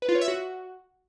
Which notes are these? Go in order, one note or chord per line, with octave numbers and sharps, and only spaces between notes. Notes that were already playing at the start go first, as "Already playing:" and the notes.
B4
F4
C#5
E5
F#4